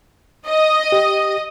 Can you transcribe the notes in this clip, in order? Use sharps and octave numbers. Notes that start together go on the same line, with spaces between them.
D#5
G4